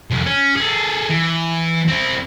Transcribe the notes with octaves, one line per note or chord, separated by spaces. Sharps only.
C2 F2
C#4
G#4 A4
E3
C4 E4